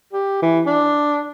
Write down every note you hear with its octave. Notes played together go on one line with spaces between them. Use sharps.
G4
E3
D4